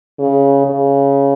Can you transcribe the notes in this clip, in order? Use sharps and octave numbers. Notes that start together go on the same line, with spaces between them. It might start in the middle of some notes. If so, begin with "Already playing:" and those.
C#3
C#3